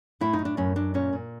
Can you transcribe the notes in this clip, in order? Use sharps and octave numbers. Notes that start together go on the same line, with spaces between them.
A2 E4
D#4
A2
D4
F#2 C#4
F#2 D4
A#2 C#4
A#2